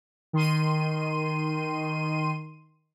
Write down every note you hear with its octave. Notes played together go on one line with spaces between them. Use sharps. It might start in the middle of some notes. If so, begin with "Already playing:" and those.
D#3 C6 D#7